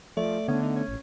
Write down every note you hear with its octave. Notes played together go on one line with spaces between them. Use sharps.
F3 A3 D5
D3 B3 C#4
D#4
C#4
A1